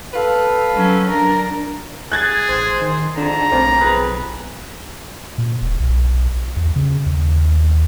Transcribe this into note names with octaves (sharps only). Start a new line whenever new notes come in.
A4 B4 F5
F#3 C#4
D4 A#4
G#4 F#6 G#6 A6
A1 C5
D#3
F2 G#2 D3 D4 A#5
B1 A2 A#3 C4
F2 G#4 B4
A#2
D#1
B1
E2
C#3
D#2